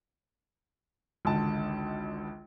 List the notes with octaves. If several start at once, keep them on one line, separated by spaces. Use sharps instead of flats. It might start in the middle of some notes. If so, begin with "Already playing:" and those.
G#1 C#2 D3 A5